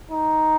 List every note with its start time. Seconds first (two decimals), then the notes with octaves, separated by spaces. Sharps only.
0.11 D#4